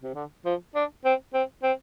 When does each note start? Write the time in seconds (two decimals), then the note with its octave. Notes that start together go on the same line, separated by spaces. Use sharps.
0.03 C3
0.15 D3
0.45 F3
0.75 D4
1.05 C4
1.34 C4
1.63 C4